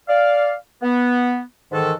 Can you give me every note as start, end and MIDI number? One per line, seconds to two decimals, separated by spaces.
0.08 0.54 74
0.08 0.54 77
0.82 1.40 59
1.72 1.93 44
1.72 1.93 51
1.72 1.93 52
1.72 1.93 69